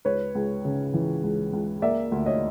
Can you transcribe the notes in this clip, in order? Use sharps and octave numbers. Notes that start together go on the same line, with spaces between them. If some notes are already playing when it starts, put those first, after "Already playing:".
C#2 B4 C#5
C#2
C#3
E3
C#2
C#2
A#3 D5 E5
D2
C#5 D#5